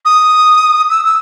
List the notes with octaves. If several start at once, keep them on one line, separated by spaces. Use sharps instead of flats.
D#6
E6
E6